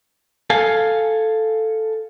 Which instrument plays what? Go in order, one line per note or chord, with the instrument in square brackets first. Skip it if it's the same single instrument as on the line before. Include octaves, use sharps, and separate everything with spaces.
[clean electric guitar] A4 F5 G#5